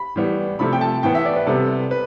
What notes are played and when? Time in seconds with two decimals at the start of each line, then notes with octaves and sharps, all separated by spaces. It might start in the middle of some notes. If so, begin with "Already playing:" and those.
Already playing: B5
0.16 A2 E3 G3 B3
0.59 C3 F3 A3 B5
0.73 G5
0.81 A5
1.03 A2 E3 B3 G5
1.15 E5
1.25 D5
1.36 B4
1.47 C3 G3 B3 A4
1.91 B4